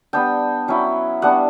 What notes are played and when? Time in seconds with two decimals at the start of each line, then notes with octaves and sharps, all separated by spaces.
0.13 G3 B3 D4 G5
0.68 F#3 C#4 E4
1.22 G3 B3 D4 F#5